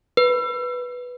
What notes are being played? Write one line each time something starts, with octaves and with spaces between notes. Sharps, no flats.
B4